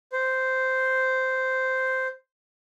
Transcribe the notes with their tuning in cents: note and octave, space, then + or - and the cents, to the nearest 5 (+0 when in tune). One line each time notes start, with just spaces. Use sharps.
C5 -5